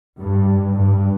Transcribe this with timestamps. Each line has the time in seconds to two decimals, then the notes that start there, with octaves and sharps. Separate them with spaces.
0.21 G2
0.72 G2